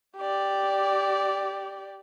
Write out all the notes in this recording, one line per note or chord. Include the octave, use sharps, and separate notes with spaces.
G4 D5